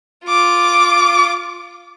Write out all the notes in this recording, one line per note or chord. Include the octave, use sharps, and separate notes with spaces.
F4 D6